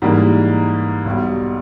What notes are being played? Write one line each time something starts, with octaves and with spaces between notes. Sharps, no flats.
G#2 E3 G3 A#3
B1 B2 G3